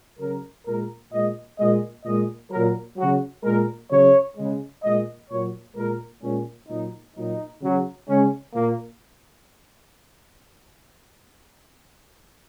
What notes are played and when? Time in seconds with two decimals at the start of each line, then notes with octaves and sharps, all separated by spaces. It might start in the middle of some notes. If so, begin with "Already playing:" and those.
0.19 C#3 F#3 A#4
0.66 A#2 G#3 A#4
1.12 A#2 G#3 D#5
1.58 A#2 G#3 D#5
2.04 A#2 G#3 D#5
2.51 A#2 F#3 A#4
2.97 C#3 F#3 F#4
3.44 A#2 G#3 A#4
3.90 C#3 F#3 C#5
4.36 C#3 G#3
4.82 A#2 G#3 D#5
5.29 A#2 F#3 C#5
5.75 A#2 G#3 A#4
6.22 A#2 G#3 C#4
6.68 A#2 F#3 D#4
7.15 A#2 F#3 D#4
7.61 C#3 F#3
8.08 C#3 G#3 C#4
8.53 A#2 A#3